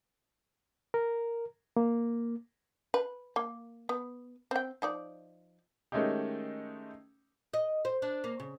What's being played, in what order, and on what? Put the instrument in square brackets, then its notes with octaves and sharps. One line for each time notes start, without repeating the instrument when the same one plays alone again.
[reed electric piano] A#4
A#3
[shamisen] B4
A#3
B3
C4 G5
F3 D#4 D5
[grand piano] D#3 G#3 A3 C#4 D#4 G4
[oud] D#5
C5
D4
A#3
C#3